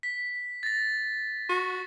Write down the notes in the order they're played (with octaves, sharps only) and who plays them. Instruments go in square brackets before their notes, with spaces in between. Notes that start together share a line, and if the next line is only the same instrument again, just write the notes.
[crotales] B6
A6 A#6
[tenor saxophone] F#4